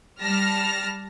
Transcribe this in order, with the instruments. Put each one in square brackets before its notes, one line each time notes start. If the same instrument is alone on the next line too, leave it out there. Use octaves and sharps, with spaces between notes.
[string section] G3 A5 F6 A#6